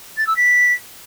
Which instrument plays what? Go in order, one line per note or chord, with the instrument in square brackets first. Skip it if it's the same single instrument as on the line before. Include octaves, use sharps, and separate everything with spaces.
[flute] A6
E6
B6